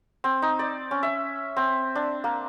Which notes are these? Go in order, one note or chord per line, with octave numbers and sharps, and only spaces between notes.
C4
D#4
D5
C#4
E5
C4
D4
A#3